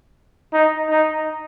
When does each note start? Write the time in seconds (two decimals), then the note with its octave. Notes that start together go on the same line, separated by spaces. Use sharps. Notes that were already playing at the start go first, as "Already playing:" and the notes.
0.53 D#4
0.90 D#4